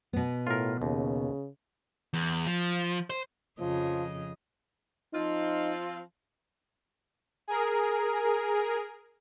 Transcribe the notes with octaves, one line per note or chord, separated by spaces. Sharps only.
B2 B3
A2 F4 A#4
D#2 C#3
E2
F3
C5
F2 C#3 F3 D#5
F3 C4 D#4 F4
G#4 A#4